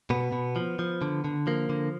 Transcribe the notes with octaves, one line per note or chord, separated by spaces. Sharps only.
B2 B3
B2
F3
F3
D3
D3
F3 A#3
D3